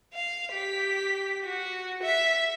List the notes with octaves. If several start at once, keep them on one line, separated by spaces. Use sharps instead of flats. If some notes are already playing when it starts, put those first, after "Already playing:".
F5
G4 B6
F#4
E5 B6